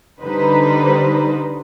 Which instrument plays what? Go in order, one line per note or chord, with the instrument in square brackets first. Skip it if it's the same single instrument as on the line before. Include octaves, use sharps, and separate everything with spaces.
[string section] D3 G3 D#4 B4 C5